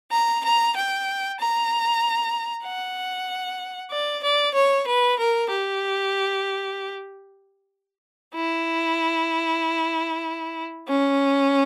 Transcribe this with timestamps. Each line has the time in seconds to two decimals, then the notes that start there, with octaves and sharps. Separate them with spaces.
0.12 A#5
0.43 A#5
0.75 G5
1.39 A#5
2.65 F#5
3.91 D5
4.23 D5
4.55 C#5
4.87 B4
5.19 A#4
5.49 G4
8.34 E4
10.88 C#4